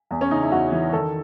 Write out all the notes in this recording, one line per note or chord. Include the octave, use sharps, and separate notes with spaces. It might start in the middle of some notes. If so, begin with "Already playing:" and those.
E2
C#4
C#3 D#4
E4
E2 F#4
E3
D#3 A4